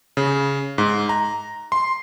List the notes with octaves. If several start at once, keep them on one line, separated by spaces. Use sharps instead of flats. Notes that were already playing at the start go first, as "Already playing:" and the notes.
C#3
G#2
A#5
C6